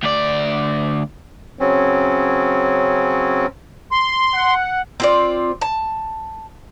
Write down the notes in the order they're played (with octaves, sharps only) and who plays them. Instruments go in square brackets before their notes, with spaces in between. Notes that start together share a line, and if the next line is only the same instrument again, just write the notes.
[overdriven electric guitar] D2 D5
[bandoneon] C#3 F#3 C4 C#4
[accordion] C6
[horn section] F#5
[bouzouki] C4 F4 D5
A5